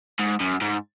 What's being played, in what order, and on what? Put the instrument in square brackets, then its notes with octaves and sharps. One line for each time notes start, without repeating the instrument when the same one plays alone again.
[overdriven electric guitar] G#2
F#2
G#2